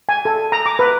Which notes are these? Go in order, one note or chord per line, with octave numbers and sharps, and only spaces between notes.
G#5
A4
A#5
D6
B4